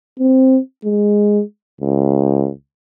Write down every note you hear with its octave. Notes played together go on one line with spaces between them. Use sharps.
C4
G#3
C#2